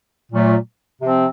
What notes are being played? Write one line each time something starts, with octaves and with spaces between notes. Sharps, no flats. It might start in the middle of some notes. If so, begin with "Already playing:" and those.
A#2 F#3 A3
C3 F3 C4